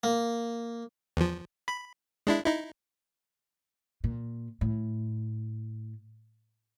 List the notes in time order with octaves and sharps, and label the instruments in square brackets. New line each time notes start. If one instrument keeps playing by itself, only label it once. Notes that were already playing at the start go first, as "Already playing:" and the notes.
[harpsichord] A#3
[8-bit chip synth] E2 F3
B5
G#3 D4 E4
D#4 E4
[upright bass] A#2
A2